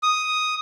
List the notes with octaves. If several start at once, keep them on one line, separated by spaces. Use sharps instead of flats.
D#6